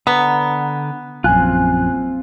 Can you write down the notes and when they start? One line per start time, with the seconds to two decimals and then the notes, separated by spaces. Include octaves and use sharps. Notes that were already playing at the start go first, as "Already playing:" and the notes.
0.07 D3 B3 A#5
1.24 A#1 F#2 C4 F4 G#5 F#6